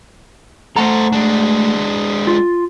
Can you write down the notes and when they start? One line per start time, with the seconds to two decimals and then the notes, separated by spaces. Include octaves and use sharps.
0.76 A3 A4 C5 F#5 A#5
1.13 G#3 D4
2.27 F4